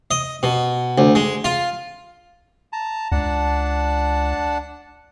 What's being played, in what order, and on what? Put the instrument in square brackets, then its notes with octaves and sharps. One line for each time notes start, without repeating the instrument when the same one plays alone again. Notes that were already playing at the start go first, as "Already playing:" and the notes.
[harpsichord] D#5
B2
D2
G#3
F4
[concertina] A5 A#5
[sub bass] C#2 [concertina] D4 F#5 A5